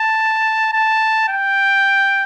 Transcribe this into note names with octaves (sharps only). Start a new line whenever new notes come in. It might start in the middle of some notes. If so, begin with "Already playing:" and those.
Already playing: A5
A5
G5